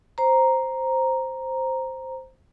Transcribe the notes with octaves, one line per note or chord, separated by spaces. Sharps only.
C5 A#5